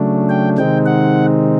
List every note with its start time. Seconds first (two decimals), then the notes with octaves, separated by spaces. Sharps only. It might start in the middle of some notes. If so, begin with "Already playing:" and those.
Already playing: C#3 F#3 A3 D4
0.29 G5
0.58 C3 D#3 G#3 C4 D#4 G5
0.86 F#5